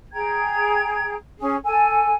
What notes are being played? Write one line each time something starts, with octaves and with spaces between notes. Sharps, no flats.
G#4 G5 A#5 G#6
C#4 G#4
A4 G#5